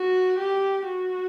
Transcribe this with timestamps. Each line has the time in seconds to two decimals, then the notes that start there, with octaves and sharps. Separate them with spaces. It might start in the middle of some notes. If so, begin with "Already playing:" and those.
Already playing: F#4
0.39 G4
0.87 F#4